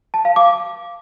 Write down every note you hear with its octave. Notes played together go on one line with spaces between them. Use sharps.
A5
F5
D6